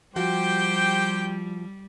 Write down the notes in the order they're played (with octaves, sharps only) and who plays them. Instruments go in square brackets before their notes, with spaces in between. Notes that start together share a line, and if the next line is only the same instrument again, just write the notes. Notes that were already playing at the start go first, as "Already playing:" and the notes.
[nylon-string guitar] F3 F#4 [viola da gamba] G3 [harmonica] G4 C5 G5